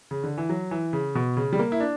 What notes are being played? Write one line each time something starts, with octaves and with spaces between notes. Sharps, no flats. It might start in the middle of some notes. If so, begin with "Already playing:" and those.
C#3
D3
E3
F#3
E3
C#3
B2
C#3
G3
A#3
E4
D4